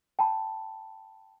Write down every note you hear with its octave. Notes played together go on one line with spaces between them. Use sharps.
G5 A5 B5